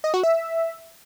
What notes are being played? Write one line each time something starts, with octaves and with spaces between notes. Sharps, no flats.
D#5
F#4
E5